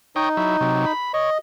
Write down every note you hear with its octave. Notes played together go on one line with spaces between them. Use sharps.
D#4 C#5 D#5 G5
F#3 E4
C3 F#3
B5
C#5 D#5